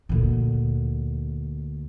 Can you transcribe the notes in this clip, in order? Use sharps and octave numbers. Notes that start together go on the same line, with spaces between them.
D2 A#2